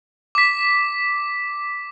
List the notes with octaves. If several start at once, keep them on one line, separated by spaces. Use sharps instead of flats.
D6 B6